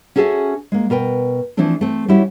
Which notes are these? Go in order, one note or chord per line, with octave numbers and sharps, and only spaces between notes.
C#4 F#4 G#4 A4 E5 G#5
G#3 A#3
B2 A#4 B4 G5
E3 F3 A3 C4 D4
A3 C4
G3 C#4 E4 F#4